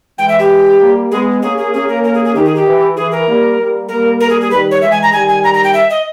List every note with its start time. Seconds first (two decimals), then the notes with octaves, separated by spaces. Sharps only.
0.18 E3 G#3 G5
0.29 E5
0.39 G4
0.80 G3 A#3
1.11 G#3 B3 G#4
1.42 A#3 C#4 G#4
1.57 G#4
1.73 A#3 C#4 G#4
1.89 A#4
2.04 A#4
2.14 G#4
2.25 G#4
2.34 D#3 G4
2.45 G#4
2.55 G4
2.66 E3
2.97 E3 G#4
3.12 A#4
3.27 G3 A#3
3.58 G3 A#3
3.88 G3 A#3 A#4
4.20 A#4
4.30 G#4
4.41 G#4
4.51 D#3 G3 B4
4.71 C#5
4.82 E3 G#3 E5
4.91 G#5
5.03 A#5
5.12 D#3 G3 G#5
5.28 G#5
5.44 A#5
5.54 A#5
5.64 G5
5.74 E5
5.90 D#5